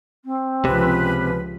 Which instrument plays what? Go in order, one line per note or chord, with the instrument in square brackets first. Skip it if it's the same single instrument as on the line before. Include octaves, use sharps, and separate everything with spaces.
[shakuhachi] C4
[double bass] C#2 F3 [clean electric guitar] C3 [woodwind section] B3 C#4 B4